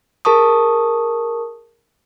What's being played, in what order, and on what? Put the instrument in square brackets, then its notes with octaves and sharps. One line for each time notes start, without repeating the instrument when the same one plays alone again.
[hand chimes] G#4 A#4 A5 C#6 D#6